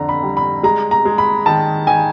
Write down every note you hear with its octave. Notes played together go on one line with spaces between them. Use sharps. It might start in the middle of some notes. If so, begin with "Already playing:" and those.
Already playing: F2 D3 A#5
B5
G3
B5
G#3 A#5
A#5
G#3
B5
D#3 A5
D#3 G#5